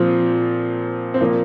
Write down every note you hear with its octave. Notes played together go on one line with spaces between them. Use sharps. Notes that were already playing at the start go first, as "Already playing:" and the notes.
Already playing: A#2 F3 C4
C4
A#2 F3 A#3